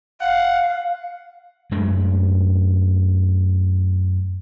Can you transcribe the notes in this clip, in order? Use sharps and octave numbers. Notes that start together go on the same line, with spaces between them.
F5 F#5
F#2 G#3 A3 D4